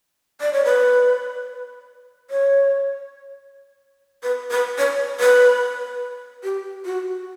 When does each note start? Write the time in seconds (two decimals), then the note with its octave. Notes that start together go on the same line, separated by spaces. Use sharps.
0.41 D5
0.53 C#5
0.65 B4
2.30 C#5
4.23 B4
4.51 B4
4.78 C#5
5.20 B4
6.44 G4
6.85 F#4